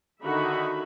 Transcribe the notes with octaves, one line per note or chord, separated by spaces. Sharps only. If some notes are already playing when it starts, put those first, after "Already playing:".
D3 D#3 D#4 F#4 E5 B5